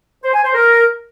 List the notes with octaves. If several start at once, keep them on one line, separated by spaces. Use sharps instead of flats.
C5
G#5
C5
A#4